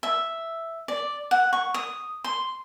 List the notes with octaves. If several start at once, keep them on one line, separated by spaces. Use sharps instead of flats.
E5
D5
F#5
C#6
D#6
C6